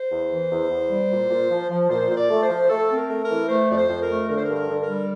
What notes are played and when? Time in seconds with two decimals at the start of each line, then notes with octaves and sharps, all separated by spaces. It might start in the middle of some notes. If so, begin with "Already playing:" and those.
Already playing: C5
0.11 E2
0.31 E3
0.50 E2
0.70 E2
0.90 G3
1.10 A#2
1.30 A#2
1.49 F3
1.70 F3
1.89 A#2 C5
2.10 A#2
2.17 D5
2.29 A3
2.43 C5
2.49 F3
2.69 A3 A4
2.90 C4
2.97 A#4
3.09 A3
3.23 A#4
3.29 E3
3.49 A3 C5
3.69 F2 D5
3.76 C5
3.89 F2
4.02 A#4
4.10 A3
4.28 D3 A#4
4.37 C5
4.44 A#4
4.49 G2
4.55 A#4
4.69 D3
4.82 A#4
4.89 G3